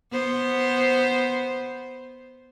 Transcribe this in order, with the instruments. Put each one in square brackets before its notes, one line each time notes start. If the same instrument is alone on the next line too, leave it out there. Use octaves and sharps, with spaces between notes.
[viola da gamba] B3 C5